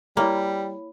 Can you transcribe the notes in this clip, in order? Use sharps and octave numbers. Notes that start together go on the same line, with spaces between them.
G3 A#3 E4 C#5 B5